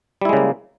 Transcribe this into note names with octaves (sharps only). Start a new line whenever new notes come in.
C#3 G3 G#3 A#3 E4